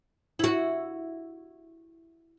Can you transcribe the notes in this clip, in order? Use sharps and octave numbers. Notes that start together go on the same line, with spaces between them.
E4 F#4